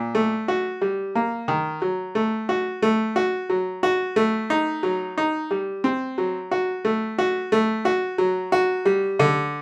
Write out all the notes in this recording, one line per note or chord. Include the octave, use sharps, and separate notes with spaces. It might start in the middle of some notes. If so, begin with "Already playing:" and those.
Already playing: A#2
A3
F#4
G3
A#3
D#3
F#3
A3
F#4
A3
F#4
F#3
F#4
A3
D#4
F#3
D#4
G3
C4
F#3
F#4
A3
F#4
A3
F#4
F#3
F#4
G3
D3